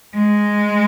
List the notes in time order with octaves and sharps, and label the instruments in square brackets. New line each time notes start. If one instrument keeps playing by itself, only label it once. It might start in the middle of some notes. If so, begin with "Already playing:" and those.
[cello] G#3